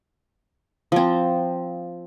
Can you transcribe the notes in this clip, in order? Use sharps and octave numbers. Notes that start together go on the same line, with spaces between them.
F3 C4